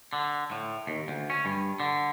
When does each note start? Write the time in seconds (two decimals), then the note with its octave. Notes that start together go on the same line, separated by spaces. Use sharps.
0.13 D3
0.51 A2
0.87 D#2
1.08 D2
1.30 C#4
1.45 G2
1.80 D3